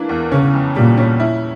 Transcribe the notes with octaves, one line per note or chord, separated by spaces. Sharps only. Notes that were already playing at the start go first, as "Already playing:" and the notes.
Already playing: E3 A#3 D4
E2
C#3 C#4
F2
A#2 G3
C#4
E4